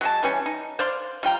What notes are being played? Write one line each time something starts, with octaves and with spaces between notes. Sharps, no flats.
F#3 G#3 A5
E3 G3 C#4
D#4
C5 D5 F5 C6
G3 F4 G5 A#5